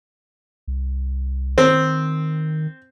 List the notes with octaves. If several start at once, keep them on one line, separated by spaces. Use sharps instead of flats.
C2
D#3 C4